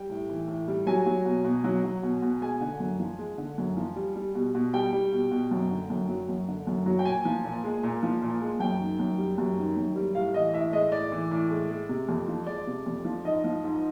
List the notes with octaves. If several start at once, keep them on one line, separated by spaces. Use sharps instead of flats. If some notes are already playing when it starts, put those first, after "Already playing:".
Already playing: G3 G5
A2
E3
A2
G3
F#3 G#5
F#3
B2
B2
F#3
F#3
B2
B2
G#3 G#5
D3
F#2
F3
G#3
D3
F#2
F3
G3
G3
B2
B2
G3 G5
G3
B2
B2
F#2
D3
F#2
F#3
F#2
D3
F#2
F#3
G5
A#2 G#5
F3
A#2
G#3
A#2
F3
A#2
G#3
F#2 G5
D#3
F#2
G3
F#2
D#3
F#2
G3
A2 F5
E3 D#5
A2 E5
G#3 D#5
A2 D5
E3
A2
G#3
G#3
C3
F2
F3
G#3 D5
C3
F2
F3
G#2 D#5
F3
G#2